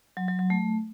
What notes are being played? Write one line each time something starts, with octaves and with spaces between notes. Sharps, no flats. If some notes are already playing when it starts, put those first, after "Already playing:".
F#3
F#3
F#3
A3